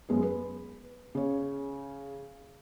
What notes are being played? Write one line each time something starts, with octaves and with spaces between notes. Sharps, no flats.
F#2 G#3 B3
B4
C#3 C#5